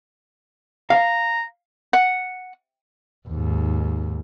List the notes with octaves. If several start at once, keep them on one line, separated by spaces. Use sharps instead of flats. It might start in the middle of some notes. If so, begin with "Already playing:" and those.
F5 A#5
F#5
D#2 G#2